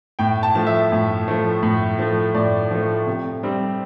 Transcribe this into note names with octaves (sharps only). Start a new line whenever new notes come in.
A2 G5
A5
F3 A3
E5
A2
F3 A3
A2
F3 A3
A2 D5
F3 A3
C3
G3 C4